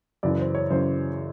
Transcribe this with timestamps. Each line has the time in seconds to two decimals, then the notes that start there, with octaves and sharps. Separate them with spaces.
0.23 F#2 C#3 E3 D5
0.39 C5
0.55 C#5
0.70 F#2 C#3 E3 C5